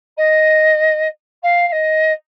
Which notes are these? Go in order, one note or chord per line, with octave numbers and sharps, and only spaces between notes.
D#5
F5
F5
D#5